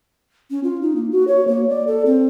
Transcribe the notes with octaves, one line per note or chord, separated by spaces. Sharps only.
C#4
F4
D#4
A#3
F#4
C#5
A#3
D5
A4
C4